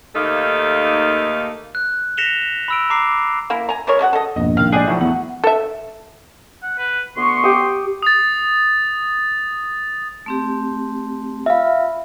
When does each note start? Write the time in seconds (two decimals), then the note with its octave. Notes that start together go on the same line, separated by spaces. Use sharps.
0.15 D#2 A3 A#3 D#4 A4 F5
1.75 F#6
2.17 A#6 B6 C#7 E7 F7 G7
2.68 B5 E6 D7
2.90 A#5 D6 C7
3.50 A#3 E4 A#4
3.69 G#5 A#5
3.87 E3 G#3 A#4 C#5
3.99 G#3 A3 F#4 F#5
4.13 A4 D#5
4.36 A#1 F2 G#2 B2 D#5
4.57 A2 C3 D#3 F5
4.72 G#3 G4 G#4 D5 F#5
4.87 B1 A2 F3 E5 C#6
5.01 E2 F#5
5.44 A4 E5
6.63 F#5
6.79 B4
7.17 D2 B3 C6 C#6
7.44 G4 D#6
8.02 D#6 A6
10.26 A3 C4 G4
11.46 F4 E5 F5 B5